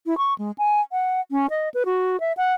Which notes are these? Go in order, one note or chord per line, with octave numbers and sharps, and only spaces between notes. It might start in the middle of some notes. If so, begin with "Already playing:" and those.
E4
C#6
G#3
G#5
F#5
C#4
D#5
B4
F#4
E5
F#5